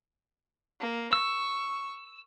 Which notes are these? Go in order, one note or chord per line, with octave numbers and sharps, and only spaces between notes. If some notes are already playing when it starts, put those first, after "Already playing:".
A#3
C#6 E6